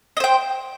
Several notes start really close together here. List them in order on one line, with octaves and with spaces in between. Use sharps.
D#5 C5 G5